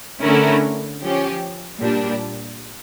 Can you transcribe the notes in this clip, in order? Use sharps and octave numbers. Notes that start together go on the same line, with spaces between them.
D3 A3 C#4 E4 A#4
F3 C#4 G4
A#2 G3 D4